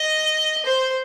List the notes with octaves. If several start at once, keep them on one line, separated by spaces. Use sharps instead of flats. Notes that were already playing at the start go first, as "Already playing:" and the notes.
Already playing: D#5
C5